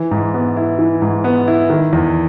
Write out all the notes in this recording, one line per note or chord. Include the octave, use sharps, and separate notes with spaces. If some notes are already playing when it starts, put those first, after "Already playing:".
Already playing: E3
G#2
B3
E4
E3
G#2
B3
E4
D#3
E2